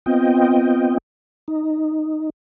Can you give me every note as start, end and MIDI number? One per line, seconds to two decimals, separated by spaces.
0.06 0.98 59
0.06 0.98 60
0.06 0.98 65
0.06 0.98 75
0.06 0.98 79
1.48 2.30 63